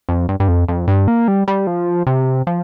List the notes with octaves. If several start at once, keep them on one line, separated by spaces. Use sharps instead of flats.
F2
G2
G2
F2
F2
G2
A#3
G3
G3
F3
C3
F3